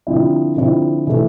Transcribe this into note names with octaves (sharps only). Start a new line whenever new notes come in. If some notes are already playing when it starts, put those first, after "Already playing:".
D3 F3 C4 E4
D3 F3 C4 E4
E3 A3